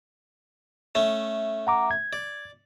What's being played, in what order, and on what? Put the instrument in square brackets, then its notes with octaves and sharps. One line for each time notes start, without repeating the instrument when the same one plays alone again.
[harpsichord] A3 C#4
[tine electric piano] F#5 A#5 D6
G#6
[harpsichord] D5